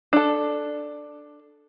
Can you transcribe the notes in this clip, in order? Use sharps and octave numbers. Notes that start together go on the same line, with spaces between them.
D4 A4